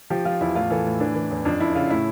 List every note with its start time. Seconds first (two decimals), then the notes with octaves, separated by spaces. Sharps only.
0.10 F3 G4
0.25 F3 F4
0.41 E2 E4
0.55 A2 F4
0.71 E3 A4
0.86 A2
1.00 E3 D4
1.15 E3
1.31 E2
1.45 F2 D4
1.60 F2 E4
1.75 C#3 F4
1.90 A2 E4